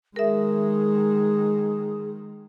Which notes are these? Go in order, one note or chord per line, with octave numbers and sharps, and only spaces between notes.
D#3 G#3 G#4 A#4 E5